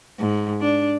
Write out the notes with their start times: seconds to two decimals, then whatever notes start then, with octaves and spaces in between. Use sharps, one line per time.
0.19 G#2
0.61 D4